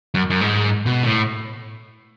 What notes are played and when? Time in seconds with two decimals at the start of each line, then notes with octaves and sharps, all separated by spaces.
0.14 F#2
0.30 F#2
0.41 G#2
0.86 B2
1.03 A2